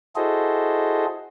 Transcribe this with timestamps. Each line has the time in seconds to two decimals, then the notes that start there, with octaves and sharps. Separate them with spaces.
0.16 E4 F#4 G#4 A4 C5 D#5